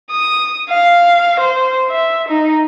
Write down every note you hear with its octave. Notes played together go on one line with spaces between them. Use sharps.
D#6
F5
C5
E5
D#4